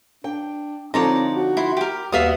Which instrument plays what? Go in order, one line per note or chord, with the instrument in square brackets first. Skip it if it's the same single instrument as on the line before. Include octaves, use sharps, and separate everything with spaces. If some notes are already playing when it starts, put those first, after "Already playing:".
[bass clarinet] D4 [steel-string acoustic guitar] G5
[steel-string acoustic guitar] D3 F3 D#4 [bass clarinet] C4 [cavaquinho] C#5 D5 A#5
[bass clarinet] F#4
[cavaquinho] E4 C6
G4 A#4
[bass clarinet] D#2 [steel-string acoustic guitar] G3 B3 F#4 [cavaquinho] E5 F5 D#6